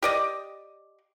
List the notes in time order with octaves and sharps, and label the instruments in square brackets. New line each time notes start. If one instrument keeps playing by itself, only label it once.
[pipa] G4 D5 D#5